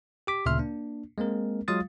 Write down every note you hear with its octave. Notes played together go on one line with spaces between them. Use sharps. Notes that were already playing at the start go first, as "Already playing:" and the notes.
G4 D6 B6
D2 A#2 C#3 E5 C6 F6
A#3 D4
G#3 A#3 C4 A#4
F#3 G#3 F4 F5 D#6 A6